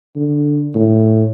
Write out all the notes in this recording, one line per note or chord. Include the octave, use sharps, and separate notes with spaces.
D3
A2